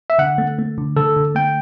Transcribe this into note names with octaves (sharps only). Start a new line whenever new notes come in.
E5
D3 F#5
A3
A3
D3
D3 A4
D3
A3 G5